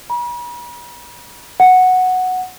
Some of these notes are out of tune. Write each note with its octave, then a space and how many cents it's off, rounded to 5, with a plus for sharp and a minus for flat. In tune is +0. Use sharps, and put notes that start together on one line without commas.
B5 -45
F#5 -5